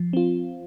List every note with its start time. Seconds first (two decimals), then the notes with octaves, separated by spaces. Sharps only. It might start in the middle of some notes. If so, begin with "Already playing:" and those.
Already playing: F3
0.13 C4 F4